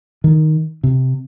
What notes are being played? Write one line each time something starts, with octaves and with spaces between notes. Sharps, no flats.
D#3
C3